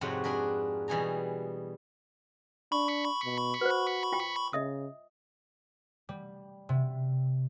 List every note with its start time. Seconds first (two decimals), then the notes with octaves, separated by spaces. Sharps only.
0.01 F2 G#2 C3 F#4 C#5 F#5
0.24 D4 G#4 A#4 B4
0.88 B2 E3 G3 G#4 G#5 A#5
2.72 D4 B5 C#6
3.24 B2
3.61 F#4 B4 C5
4.12 F4 G5
4.53 C#3 D#5 E5 D#6
6.09 G3
6.69 C3